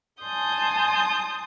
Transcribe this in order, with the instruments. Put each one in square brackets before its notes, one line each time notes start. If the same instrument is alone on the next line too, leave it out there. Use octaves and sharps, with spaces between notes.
[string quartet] G#5 A5 C6 D#6 G6